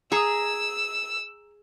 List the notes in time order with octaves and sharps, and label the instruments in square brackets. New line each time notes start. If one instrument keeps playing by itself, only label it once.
[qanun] G#4 [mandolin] A#5 D#6 [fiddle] E6